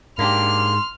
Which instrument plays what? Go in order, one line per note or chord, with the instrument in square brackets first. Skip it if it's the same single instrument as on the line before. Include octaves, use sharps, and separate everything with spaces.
[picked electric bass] G#2 [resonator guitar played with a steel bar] A#3 D4 G4 [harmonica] C6 [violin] F6